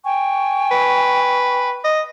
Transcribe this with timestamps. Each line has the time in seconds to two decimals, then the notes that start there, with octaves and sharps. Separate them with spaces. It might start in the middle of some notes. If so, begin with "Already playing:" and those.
0.05 G5 G#5 C#6
0.71 B4
1.84 D#5